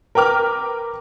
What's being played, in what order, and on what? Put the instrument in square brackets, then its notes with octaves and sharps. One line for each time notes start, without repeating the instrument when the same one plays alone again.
[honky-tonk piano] A#4 B4 G5 D6 F6